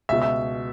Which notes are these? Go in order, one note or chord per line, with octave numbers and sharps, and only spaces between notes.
C#2 B2 E5
E5